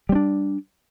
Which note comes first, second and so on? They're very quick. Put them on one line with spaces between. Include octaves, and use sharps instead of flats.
G3 C4 D4